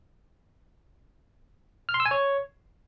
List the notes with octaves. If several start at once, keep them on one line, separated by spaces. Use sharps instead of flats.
F6
C6
E6
G#5
C#5